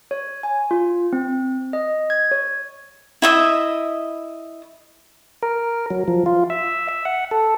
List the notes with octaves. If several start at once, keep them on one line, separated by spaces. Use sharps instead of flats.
C#5
G#5
F4
C4
D#5
G#6
C#5
E4 D#5 E5
A#4
F#3
F3
F4
E5
E5
F#5
A4